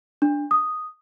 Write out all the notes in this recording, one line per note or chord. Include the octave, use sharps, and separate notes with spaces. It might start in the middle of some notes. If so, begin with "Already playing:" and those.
D4
D#6